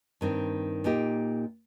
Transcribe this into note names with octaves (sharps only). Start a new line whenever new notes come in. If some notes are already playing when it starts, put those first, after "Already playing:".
G2 D#3 C4
A#2 A#3 D#4 G4